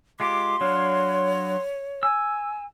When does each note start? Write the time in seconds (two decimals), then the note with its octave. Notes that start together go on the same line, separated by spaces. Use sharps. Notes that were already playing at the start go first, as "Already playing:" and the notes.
0.20 G#3 F4 G4 C6 D6
0.61 F#3 D4 C#5 F5
2.03 G#5 E6